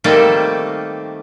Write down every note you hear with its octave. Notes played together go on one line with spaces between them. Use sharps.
D#3 G3 A3 A#3 C4 A4